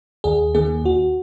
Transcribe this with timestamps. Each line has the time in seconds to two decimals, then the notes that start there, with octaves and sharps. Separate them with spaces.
0.24 D#2 G#4
0.54 D#3 A#3 G#4
0.84 D#2 F#4